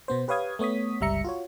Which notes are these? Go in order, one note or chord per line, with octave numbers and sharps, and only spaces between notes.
B2 B3 C5
G4 B4 C#5 F5 D#6 G#6
A3 B3 C#5 D#6 B6
G1 C#2 G3 E5 A#5 C#7
F4 F#4 C#5